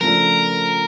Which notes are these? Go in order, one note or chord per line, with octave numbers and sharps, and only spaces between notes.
C#3 F3 A3 D4 A#4